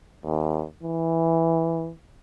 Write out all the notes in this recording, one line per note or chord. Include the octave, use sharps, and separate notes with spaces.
D#2
E3